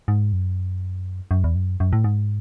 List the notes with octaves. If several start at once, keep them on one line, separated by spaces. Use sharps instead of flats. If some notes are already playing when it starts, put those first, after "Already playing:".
G#2
F#2
F#2
E2
F#2
F#2
A2
G#2